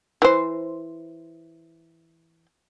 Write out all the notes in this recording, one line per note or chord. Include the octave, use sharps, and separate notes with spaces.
E3 C5